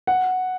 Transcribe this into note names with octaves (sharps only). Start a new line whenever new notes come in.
F#5